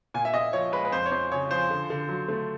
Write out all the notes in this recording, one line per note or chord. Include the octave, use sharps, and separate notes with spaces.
A#2 G#5
E5
A#2 D#5
F3 C#5
G#3 B4
B4
F2 C5
C#5
F2 C5
C#3 C#5
F3 C5
D3
D3
F#3
A3